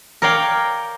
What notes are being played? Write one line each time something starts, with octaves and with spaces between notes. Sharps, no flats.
A#4 C#5 D5 F5 G5